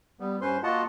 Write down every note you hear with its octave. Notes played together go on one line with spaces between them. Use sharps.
G3 B3
G2 C#4 B4 C5 C6
A#3 F4 F#4 D#5 F#5 A5